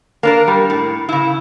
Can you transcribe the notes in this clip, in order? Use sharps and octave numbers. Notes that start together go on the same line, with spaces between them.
A#3 D4 A#4
G3
A2
C#3 E4